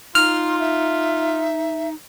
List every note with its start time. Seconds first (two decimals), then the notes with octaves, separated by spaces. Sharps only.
0.15 D#4 F4 C6 F6
0.60 E5